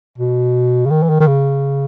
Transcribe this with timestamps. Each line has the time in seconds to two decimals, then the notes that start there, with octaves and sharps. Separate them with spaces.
0.18 B2
0.86 C#3
0.91 D#3
1.03 E3
1.09 D#3
1.20 D#3
1.27 C#3